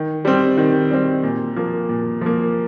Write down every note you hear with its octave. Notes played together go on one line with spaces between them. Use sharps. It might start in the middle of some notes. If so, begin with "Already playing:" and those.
Already playing: D#3
G3 C4
D#3
G3 C4
A#2
F3 A#3
A#2
F3 A#3